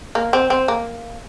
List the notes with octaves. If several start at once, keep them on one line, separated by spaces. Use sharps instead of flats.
A#3
C4
C4
A#3